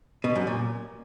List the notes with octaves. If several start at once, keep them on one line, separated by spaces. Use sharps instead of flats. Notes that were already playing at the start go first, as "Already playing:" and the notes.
B2
F#2
A#2